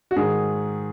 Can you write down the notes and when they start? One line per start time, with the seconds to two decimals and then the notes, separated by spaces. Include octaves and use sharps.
0.11 F#4
0.16 G#2 D#3 G#4